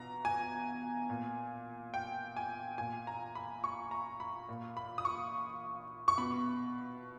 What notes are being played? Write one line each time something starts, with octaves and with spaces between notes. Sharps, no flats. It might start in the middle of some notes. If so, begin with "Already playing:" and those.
Already playing: B2 A#5
G#5
A#2
G5
G#5
A#2 G#5
A#5
B5
C#6
A#5
B5
A#2
B5
D#6
C#6
C#6
B2 B5